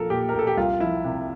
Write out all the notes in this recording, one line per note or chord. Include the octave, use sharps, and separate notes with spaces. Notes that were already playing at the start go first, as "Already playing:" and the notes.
Already playing: A#1 F3 A4 A#4
A#2 G4
A#4
A#1 A4
G4
C2 F4
F3 E4
C3